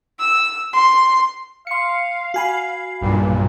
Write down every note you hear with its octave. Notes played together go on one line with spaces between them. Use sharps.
E6
C6
F5 C6 C#7
F#4 G#5 B5
B1 G2 A#2